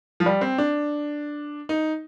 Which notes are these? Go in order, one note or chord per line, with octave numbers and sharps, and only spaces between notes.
F3
G3
C4
D4
D#4